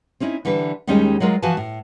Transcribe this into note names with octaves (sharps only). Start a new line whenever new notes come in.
C4 C#4 D#4 E4
D3 E3 G3 B4
D#2 D#3 G3 G#3 C#4 D#4
F#3 G#3 F4 A#4
E3 F3 F#4 B4 G#5 A5
A2